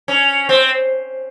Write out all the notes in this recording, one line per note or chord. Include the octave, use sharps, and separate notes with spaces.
C#4
C4